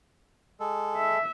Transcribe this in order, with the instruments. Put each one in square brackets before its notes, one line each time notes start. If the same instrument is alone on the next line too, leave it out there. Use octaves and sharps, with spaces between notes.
[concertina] G#3 A4
[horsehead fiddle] E5